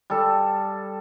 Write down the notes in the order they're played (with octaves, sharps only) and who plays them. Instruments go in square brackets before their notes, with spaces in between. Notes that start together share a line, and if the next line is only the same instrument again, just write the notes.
[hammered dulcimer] G3 A4